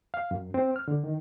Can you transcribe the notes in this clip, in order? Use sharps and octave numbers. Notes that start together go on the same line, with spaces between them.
F5
F#2
C4
F6
D3
D#3